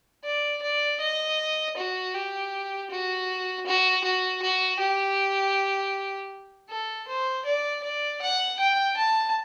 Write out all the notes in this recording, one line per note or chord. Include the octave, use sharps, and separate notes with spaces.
D5
D5
D#5
F#4
G4
F#4
F#4
F#4
F#4
G4
A4
C5
D5
D5
F#5
G5
A5